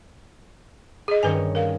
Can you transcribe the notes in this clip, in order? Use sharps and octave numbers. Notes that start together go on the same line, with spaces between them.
G#4 D#5
G2 D#3 C#4 B4 G#5
A#4 F5